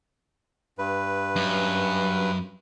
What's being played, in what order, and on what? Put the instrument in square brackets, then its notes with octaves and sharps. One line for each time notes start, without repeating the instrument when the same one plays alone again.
[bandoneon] G2 B4
[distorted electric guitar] F#2